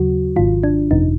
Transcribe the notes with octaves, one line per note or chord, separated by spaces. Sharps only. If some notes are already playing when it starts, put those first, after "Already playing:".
Already playing: D#2 C#3 F#3 F#4
G#1 G#2 D#3 F4
D4
G1 F2 C3 D#4